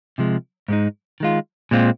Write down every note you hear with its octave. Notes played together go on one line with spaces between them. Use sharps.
C3 F3 G#3
G#2 G#3 D#4
D#3 G#3 F4
A#2 G#3 C4 F4